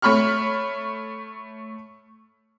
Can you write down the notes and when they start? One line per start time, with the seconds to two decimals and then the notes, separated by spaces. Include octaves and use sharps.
0.02 A3 C#5 B5 C#6 F6